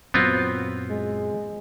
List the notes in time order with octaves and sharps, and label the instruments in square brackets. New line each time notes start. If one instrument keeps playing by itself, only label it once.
[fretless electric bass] F#2 A#2 F#3 [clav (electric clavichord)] B3 C4 F4
[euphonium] G#3